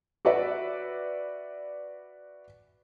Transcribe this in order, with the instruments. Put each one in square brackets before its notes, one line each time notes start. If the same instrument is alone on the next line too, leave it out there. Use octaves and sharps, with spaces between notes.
[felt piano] F#4 B4 D5 E5